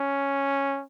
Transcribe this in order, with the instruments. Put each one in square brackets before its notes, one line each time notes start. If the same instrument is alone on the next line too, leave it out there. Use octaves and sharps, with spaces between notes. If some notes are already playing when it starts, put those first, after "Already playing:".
Already playing: [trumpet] C#4